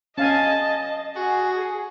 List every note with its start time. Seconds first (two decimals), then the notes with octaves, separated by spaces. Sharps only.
0.18 C#4 D#5 F5 G#5 A5
1.16 F#4 G#4